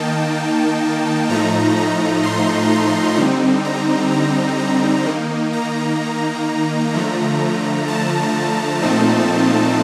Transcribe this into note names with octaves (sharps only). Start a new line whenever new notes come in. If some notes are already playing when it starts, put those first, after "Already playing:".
Already playing: D#3 A#3 D#4 G5 A5
A2 F3 A3 D#4 A#5
A#5
C6
A#5
D3 G3 C4 D#4
A#5
A#5
A#5
D#3 A#3 D#4
A#5
D3 F3 A3
A5
A#2 F3 A3 C4 D#4